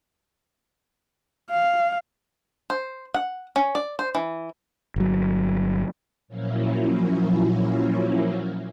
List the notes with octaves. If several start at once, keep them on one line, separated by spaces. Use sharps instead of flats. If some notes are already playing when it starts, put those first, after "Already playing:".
F5
C5
F#5
C#4
D5
C5
E3
G1 F#3
A#2 F3 F#3 A#3 C#4 E4